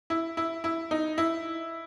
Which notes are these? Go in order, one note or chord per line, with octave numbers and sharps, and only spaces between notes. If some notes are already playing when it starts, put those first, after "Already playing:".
E4
E4
E4
D#4
E4